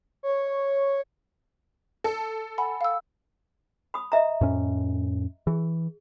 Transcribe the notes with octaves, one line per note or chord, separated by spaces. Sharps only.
C#5
A4
F#5 G#5 B5
F5 E6
B5 D#6
D#5 E5 A#5
F2 A2 C#4
E3 G#4